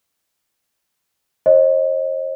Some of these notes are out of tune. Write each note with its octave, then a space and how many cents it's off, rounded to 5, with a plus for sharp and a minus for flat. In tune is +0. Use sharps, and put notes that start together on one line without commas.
C5 +45 D#5 +0